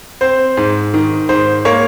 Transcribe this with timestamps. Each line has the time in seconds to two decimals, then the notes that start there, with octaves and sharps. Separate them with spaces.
0.21 C4 C5
0.57 G#2
0.94 D#3
1.29 G#2 C5
1.65 A#3 C#5